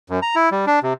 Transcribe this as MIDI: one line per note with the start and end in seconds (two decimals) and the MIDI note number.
0.10 0.20 42
0.22 0.35 82
0.35 0.49 64
0.52 0.65 55
0.67 0.80 62
0.83 0.93 48